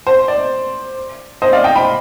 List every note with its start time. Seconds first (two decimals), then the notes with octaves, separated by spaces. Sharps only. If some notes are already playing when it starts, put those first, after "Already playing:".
0.07 C5
0.28 D5
1.42 C5 D#5
1.53 D5 F5
1.64 D#5 G5
1.75 G5 B5